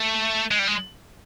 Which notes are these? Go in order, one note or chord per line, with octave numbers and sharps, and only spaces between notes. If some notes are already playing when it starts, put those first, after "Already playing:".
Already playing: A3
G#3
G3
G#3